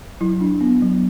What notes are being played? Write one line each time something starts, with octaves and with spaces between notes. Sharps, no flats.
F#3 E4
D4
B3
F#3